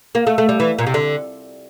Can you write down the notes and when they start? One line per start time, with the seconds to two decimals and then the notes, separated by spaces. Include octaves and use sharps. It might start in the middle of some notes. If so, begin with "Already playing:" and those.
0.15 A#3
0.27 A3
0.38 A3
0.49 G3
0.60 E3
0.79 A#2
0.87 C3
0.94 D3